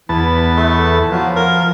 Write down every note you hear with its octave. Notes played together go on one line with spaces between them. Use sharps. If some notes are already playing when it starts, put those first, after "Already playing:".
E2 E3 B3 A5
A3
F3 F#3
A#4